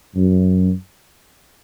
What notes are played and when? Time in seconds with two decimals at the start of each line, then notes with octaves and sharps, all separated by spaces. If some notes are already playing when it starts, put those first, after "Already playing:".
0.16 F#2